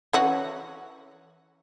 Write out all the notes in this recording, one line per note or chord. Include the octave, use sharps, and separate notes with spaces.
E3 C#4 F#4